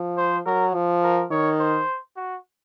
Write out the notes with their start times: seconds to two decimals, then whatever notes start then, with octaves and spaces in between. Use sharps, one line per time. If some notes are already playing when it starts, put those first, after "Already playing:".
Already playing: F3
0.18 C5
0.46 F#3 A#4
0.74 F3
1.03 A#4
1.31 D#3 C#5
1.59 C5
2.16 F#4